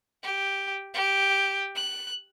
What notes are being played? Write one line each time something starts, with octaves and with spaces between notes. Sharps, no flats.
G4
G4
F#6